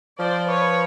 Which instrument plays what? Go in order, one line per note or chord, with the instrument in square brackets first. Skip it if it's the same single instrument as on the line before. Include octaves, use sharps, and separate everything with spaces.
[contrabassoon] F3 [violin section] C5 D5
[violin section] B4 C#5